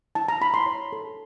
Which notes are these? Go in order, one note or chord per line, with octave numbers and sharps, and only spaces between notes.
E4 A5
A#5
E4 B5
C6
C#5
A4